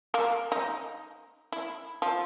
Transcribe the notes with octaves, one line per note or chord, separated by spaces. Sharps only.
A#3
D#4
E4
F3